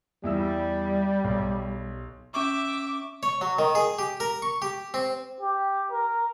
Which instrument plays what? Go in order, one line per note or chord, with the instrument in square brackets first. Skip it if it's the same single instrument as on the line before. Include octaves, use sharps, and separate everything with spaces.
[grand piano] E2 E4 E6 [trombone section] G3
[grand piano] B1
[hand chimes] C#4 C#6 [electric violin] E5 [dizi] D6
[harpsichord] C#5
F#3
D#3
G#4
G4
A#4
C#6
G4
C4
[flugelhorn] G4
A#4